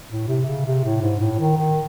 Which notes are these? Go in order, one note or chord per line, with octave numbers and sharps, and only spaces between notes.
A2
C3
C#3
C3
A2
G#2
A2
D#3
D#3